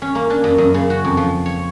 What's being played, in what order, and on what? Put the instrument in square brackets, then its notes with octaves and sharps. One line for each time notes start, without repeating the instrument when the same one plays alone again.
[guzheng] C#4
A#3
D4
F#2
F#2
C#3
F#4
F2
F3
C#5